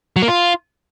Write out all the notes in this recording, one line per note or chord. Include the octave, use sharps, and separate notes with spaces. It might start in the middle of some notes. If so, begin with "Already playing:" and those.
F#3
A#3
F4